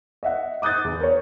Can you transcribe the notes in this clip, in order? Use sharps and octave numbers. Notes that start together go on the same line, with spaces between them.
D#5 E5 F#5
D6 D#6 F#6 G6 A6
E2
A#4 C#5